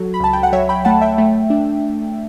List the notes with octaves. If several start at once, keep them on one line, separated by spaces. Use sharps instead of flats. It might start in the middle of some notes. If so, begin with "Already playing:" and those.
Already playing: F#3 F#4 A4
B5
C#2 A5
G5
F#5
F#3 C#5 E5
G5 B5
A3 F#5 A5
E5 G5
A3
D4